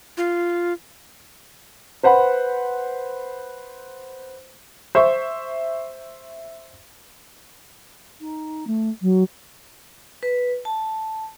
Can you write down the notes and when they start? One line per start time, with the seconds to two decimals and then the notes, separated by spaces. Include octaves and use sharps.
0.17 F4
2.03 B4 C5 F#5 B5
4.95 C5 E5 C#6
8.20 D#4
8.67 A3
9.01 F#3
10.23 B4
10.65 A5